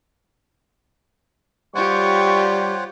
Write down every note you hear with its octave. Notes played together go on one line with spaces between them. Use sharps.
G3 F4 G4 C5 C#5 F#5 C#6